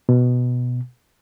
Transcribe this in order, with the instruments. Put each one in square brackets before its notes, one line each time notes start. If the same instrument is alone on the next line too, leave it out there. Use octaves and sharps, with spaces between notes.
[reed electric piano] B2